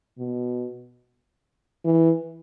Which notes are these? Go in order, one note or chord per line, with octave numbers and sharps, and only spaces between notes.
B2
E3